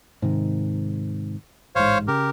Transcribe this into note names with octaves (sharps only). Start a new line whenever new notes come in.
G#2 C3 D#3
A1 G#2 C5 C#5 F5
C#3 G4 A#4